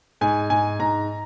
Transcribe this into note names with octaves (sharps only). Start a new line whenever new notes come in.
G#2 G#5
G#2 G#5
G#2 A#5